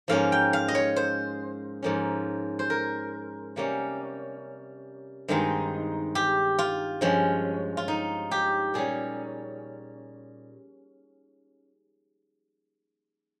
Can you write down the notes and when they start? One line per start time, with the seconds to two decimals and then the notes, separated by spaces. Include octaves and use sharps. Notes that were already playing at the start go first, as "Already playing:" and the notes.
0.08 G#2 F3 A#3 C#4 F5
0.32 G5
0.53 F5
0.68 D#5
0.75 C#5
0.96 C5
1.83 G#2 F3 A#3 C#4
2.59 C5
2.70 A#4
3.56 C3 G3 A#3 C#4
5.28 G2 D#3 G#3 C4 D#4
6.15 G4
6.59 F4
7.01 G2 F3 G#3 C#4
7.77 F4
7.88 D#4
8.31 G4
8.74 A#2 G3 C#4 G#4